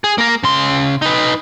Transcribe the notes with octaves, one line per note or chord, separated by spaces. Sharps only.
G#4
A#3 A#4
C#3 C6
D#4 B4